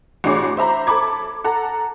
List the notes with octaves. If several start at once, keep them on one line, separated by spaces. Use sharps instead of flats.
A1 B2 D4 G#4 C#5 D6
C5 E5 A#5 B5
A4 A5 B5 D6 G#6
A4 F#5 A#5